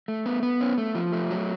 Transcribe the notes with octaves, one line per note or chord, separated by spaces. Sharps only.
A3
B3
B3
C#4
A3
F3
A3
F#3